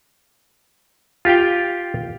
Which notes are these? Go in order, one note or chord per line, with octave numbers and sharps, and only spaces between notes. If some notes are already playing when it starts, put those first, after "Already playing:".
F4 G4 F5 G5